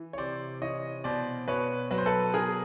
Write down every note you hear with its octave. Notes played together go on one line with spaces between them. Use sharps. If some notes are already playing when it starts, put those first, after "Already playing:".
Already playing: E3
C#5
C3 C5 D5
E3 C#5 D#5
B2 C5 D5
B2 B4 C#5
F#3 B4
C5
A4 B4
B2 G#4 A#4